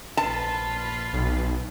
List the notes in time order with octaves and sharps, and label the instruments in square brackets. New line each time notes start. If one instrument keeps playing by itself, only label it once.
[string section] A#1 B4 [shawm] F4 [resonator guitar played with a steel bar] A5
[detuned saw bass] B1